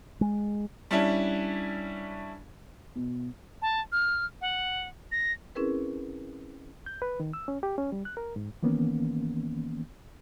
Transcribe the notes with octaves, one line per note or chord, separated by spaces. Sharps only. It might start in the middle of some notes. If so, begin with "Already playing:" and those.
G#3
G3 C#4 D4 E4
B2
A5
F6
F#5
A#6
C4 C#4 E4 G#4 A#4 B4
G6
B4
D#3
E6
C#4
G4
C#4
G3
F#6
A#4
G#2
D#3 E3 A#3 B3 C#4